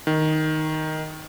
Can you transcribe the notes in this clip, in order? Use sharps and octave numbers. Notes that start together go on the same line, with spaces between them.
D#3